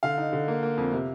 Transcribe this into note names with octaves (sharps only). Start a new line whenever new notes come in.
D3 F5
D#4
D3
A#3
A#3
F2
C3